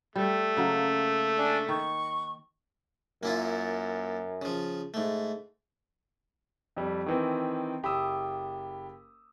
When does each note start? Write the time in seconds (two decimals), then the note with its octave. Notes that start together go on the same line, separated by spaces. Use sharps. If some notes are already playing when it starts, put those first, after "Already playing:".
0.16 G3 A3
0.57 C#3 F#3 A#3
1.37 D4 G#5
1.68 D#3 C#6
3.23 F#2 A#3 E4 F4
4.42 C#3 F3
4.94 G#2 A3
6.76 F2 G3
7.06 D#3 E3 C4
7.83 F#1 G4 B5 D#6 E6